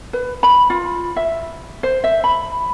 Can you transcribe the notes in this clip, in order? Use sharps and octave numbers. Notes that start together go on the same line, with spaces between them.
B4
B5
F4
E5
C5
E5
B5